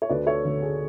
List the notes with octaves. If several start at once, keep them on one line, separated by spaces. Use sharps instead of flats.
C#5
D2 B4 D5
A4 C#5
D3 A3 A4
G#4